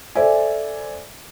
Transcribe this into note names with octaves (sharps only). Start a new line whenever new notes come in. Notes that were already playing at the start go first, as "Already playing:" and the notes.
A4 C5 D5 E5 G#5